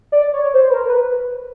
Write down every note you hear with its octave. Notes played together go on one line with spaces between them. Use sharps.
D5
C#5
C5
B4
A#4
B4